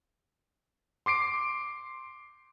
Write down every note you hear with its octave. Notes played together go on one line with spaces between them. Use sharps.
C6 D6 C7 D7